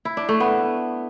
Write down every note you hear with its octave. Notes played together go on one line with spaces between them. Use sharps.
E4
D4
A3
B3